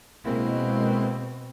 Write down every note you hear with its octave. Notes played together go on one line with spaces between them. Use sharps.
B2 G#3 A#3 C4 E4